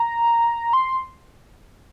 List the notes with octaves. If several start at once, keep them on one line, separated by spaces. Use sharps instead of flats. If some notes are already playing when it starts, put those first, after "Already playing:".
Already playing: A#5
C6